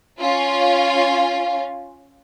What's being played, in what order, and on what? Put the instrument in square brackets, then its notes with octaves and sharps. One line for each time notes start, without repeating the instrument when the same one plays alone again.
[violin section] C#4 F4